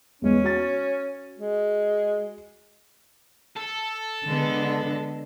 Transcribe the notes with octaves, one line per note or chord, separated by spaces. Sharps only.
E2 G#3 B3 C#4
F#4 A6
G#3
A4
D3 G#3 B3